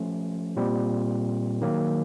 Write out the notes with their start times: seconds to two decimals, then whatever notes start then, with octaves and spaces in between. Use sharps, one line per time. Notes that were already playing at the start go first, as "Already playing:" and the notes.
Already playing: F3 A3 C#4
0.56 A#2 G3 C4
1.61 D#3 F#3 A#3